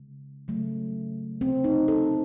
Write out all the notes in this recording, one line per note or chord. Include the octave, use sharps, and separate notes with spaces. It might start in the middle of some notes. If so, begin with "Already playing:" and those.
Already playing: C#3 G#3
C#3 F#3 A3
C4
D#4
A4